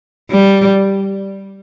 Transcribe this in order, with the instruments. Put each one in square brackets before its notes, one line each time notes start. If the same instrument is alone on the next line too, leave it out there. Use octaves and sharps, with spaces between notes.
[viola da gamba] G3